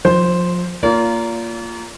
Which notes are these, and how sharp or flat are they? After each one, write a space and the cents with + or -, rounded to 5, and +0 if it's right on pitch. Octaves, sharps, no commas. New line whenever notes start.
F3 +30 C5 +0
A#3 -5 F4 -10 D5 -40